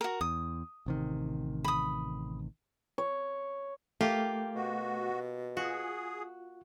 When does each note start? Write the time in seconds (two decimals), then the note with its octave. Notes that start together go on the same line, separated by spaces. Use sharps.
0.01 F#4 A#4
0.21 E2 D#6
0.86 A1 C3 D#3
1.64 B5 D#6
2.98 C#5
4.01 A3 A#3 F4 G4
4.55 B2 F#4
5.57 F4 F#4 G#4